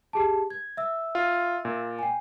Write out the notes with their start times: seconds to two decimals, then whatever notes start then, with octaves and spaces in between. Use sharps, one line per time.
0.13 G4 G#4 A5
0.50 G#6
0.77 E5 E6
1.15 F4
1.65 A#2
1.99 G5 G#5